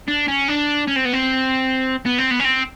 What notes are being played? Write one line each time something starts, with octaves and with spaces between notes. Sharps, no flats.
D4
C#4
D4
C#4
C4
B3
C4
B3
C4
B3
C#4
C4